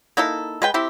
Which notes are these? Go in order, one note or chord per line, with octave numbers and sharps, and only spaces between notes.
A#3 D#4 E4 A4
G#3 B4 G5
C4 E4 G4